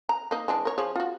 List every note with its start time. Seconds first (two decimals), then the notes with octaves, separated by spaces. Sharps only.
0.09 A#5
0.31 A#3 D#4
0.48 E3 G#3 D4
0.65 A#4 C#5
0.78 F3 G#4 C#5
0.96 F4 F#4